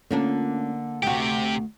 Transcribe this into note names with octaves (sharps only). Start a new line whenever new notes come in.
D3 A3 A#3 C#4 D4 F4
D2 C3 F#4 G4 G5